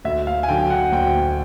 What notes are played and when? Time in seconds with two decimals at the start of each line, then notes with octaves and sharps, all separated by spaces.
0.05 D2 E5
0.27 F5
0.43 G#5
0.49 D3 F#3 G5
0.70 F#5
0.92 D2 G5